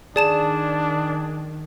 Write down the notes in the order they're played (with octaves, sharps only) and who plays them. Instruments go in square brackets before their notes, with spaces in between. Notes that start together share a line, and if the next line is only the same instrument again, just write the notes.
[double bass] D#3 [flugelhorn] D4 [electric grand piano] G#4 [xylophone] D5 A5 E7